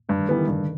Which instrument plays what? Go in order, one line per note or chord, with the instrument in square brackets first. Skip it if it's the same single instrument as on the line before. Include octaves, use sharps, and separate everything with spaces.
[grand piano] G2 [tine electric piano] A3
[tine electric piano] D#3
[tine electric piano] D3 [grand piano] E3 G3 B3
[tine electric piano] D#3
[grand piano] G2 [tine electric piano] C#3